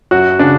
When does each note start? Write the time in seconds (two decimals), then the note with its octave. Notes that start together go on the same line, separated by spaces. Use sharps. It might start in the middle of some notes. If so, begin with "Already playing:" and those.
0.11 F#2 F#4
0.39 C#3 D4